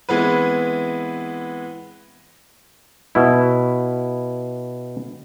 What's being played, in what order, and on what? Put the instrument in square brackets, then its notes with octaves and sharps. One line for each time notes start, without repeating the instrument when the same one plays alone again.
[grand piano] E3 G#3 B3 C4 B4
[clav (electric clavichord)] B2 E4